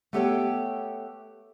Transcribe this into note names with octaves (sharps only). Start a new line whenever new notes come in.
A3 B3 G4 A4 C#5 G5